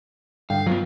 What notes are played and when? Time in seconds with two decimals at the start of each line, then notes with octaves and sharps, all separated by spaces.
0.50 G2 D3 F5 G5
0.66 D#3 F3 F#3 B3